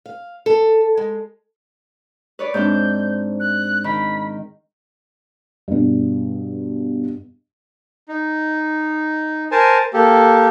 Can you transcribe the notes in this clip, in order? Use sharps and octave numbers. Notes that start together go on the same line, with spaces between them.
F5
A4
G#3
B4 C#5 D5
G#2 C4 D4 G6
F#6
D#3 B5
G2 B2
D#4
A#4 C5 G#5 A5
A#3 G4 A4